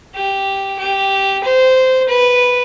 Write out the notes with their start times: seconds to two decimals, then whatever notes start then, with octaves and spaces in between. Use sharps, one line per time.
0.15 G4
0.79 G4
1.44 C5
2.08 B4